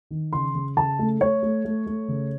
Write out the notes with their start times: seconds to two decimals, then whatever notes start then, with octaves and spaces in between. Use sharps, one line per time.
0.11 D#3
0.33 C#3 C6
0.55 C#3
0.77 C#3 A5
0.99 A3
1.20 A3 C#5
1.43 A3
1.65 A3
1.86 A3
2.08 C#3